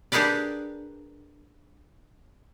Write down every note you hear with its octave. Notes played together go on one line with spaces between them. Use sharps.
D4 G4 G#4 A#4 B4 D5